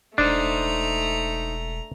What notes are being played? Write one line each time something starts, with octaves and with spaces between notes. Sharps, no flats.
E1 A3 D4 D#4 C5 A#5